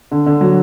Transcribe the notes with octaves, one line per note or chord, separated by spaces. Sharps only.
D3
D3
F#3